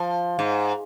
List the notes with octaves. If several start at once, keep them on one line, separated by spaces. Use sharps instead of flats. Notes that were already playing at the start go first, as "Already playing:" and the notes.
Already playing: F3
G#2